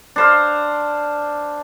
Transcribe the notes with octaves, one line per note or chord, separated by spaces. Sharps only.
D4 C5 F5